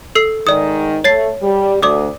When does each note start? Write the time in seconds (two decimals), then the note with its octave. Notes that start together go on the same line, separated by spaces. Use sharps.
0.15 A4 E6 C7
0.47 G#2 D#3 D5 D#6
1.04 A3 C#5 A6 C7
1.43 G3
1.82 D2 D5 D6 D#6